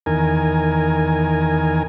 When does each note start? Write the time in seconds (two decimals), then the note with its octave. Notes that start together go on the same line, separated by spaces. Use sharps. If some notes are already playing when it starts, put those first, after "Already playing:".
0.06 E2 D#3 A#4 G#5